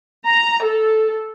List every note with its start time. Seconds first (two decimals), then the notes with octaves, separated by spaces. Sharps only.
0.24 A#5
0.62 A4